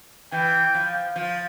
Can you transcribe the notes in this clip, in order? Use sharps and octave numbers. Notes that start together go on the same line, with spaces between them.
E3 G5
F3
F3